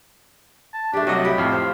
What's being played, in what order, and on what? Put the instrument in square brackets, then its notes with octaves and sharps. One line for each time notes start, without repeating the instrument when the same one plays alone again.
[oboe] A5
[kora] A3 G4 [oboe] D4
[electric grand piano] C2 D#5 [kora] F#3 [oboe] F#4
[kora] G4 [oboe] B5
[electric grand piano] F2 A2 [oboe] F5
[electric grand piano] C5 [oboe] F5